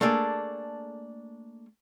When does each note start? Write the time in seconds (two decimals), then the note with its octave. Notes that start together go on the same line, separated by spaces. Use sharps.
0.01 A3 A#3 D4 G#4 A4